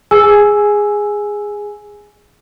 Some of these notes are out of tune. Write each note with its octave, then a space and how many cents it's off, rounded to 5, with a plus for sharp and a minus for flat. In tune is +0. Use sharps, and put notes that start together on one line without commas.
G#4 -10 G#5 +5 E6 +0